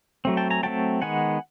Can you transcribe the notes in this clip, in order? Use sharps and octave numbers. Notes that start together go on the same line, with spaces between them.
F#3 A3 C4
G5 A5
G#5 A#5
F#3 A3 C4 G5 A5
D#3 G#3 B3 F#5 G#5